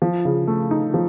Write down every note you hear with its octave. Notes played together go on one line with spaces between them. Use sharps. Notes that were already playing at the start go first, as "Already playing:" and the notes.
F3
C#3
A3
D#4
F3